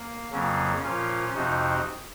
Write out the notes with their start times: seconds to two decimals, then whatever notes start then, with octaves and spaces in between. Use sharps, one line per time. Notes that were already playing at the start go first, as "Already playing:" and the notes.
Already playing: A#3
0.32 F2 C#3 F#3 A#3 C#4
0.83 A#2 F3 C#4 F4
1.34 F2 C3 F3 D#4 F#4